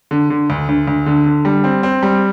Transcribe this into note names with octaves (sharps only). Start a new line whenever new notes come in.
D3
D3
D2
D2
D2
D3
D3
G3
C4
C4
G3